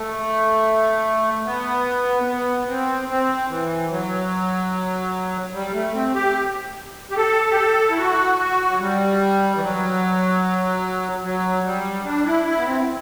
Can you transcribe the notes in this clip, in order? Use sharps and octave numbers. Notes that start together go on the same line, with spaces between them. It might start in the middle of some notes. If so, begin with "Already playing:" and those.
Already playing: A3
B3
B3
C4
C4
E3
F#3
G3
A3
C4
G4
G4
A4
G4
A4
E4
F#4
F#4
F#3
G3
E3
F#3
F#3
G3
D4
E4
E4
B3
C4